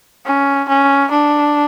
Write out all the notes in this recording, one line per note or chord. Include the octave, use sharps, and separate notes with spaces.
C#4
C#4
D4